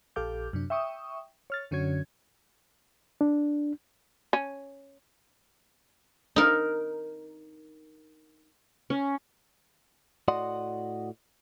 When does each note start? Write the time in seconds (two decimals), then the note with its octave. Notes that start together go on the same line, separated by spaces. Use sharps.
0.16 A#1 G4 A4 F5 D6 G6
0.53 F#2 C3 D4
0.70 E5 G5 C#6 D#6
1.50 C#5 F6 A6
1.71 F#2 D3 C#4 F#4 C#5 G#6
3.21 D4
4.33 C#4
6.36 D#4 A#4
8.90 C#4
10.28 A2 F#4 D5 D#5 F#5 C6